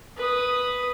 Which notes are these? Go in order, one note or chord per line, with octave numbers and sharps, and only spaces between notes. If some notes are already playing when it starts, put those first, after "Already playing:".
B4 D#6